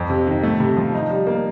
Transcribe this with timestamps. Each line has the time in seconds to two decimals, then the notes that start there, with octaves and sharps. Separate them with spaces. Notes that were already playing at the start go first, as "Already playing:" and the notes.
Already playing: F2
0.10 C3
0.27 D#3
0.43 A3
0.60 C3
0.77 F3
0.94 D#4
1.10 G3
1.27 A#3